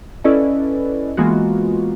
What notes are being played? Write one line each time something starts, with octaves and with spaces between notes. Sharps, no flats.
C#4 E4 A4 B4 D5 D#5
E3 G#3 A#3 B3 F4 F#4